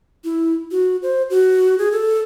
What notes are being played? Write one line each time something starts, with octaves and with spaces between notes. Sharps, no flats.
E4
F#4
C5
F#4
G#4
A4